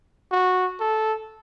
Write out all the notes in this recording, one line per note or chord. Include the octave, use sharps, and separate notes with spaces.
F#4
A4